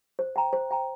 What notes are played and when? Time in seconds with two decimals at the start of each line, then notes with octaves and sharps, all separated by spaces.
0.19 C5
0.36 G5 A#5
0.53 C5
0.71 G5 A#5